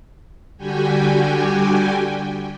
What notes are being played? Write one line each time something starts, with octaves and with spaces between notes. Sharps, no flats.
D3 G3 F#4 G4 G5 G#5